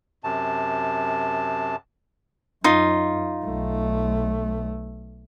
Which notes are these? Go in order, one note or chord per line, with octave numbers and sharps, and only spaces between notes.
F#2 C3 A5
F#2 D#4 F4
B1 A3